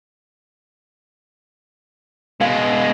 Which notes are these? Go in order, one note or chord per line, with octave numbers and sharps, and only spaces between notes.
B2 G#3 F5